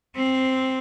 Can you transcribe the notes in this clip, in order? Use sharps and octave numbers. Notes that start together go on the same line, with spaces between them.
C4